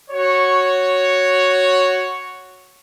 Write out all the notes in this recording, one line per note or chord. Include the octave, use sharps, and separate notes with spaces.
F#4 C#5